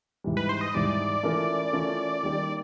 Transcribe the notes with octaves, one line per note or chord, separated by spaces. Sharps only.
G#2 E3 G3
B4
C5
D#5
G#2 E3 G3 D5
E3 A3 C#4 F4 A#4
E3 A3 C#4 F4 A#4
D#3 G3 A#3 D#4 G4